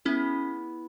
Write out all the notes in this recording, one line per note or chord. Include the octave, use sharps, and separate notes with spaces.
B3 C#4 E4 G#4